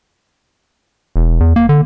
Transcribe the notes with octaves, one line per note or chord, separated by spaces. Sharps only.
E1
E2
A#3
D3